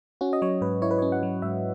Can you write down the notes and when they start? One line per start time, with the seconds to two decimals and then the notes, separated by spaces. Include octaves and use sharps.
0.21 C#4 F#4
0.33 D#5
0.42 F#3 C#5
0.61 G#2 B4
0.82 E4 C#5
0.91 B4
0.99 C#4 C#5
1.12 F#5
1.23 F#3
1.42 G#2 E5